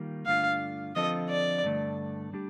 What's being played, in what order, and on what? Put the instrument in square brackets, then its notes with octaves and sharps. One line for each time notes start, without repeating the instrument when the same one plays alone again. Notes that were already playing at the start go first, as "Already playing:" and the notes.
Already playing: [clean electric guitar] D#3 G3 A#3 F4
[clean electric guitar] G2 D3 A3 D4 F4 [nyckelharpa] F5
[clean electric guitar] D3 F3 C4 F4 A4 [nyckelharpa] D#5
[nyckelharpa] D5
[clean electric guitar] G2 D3 A3
G3 D4 G4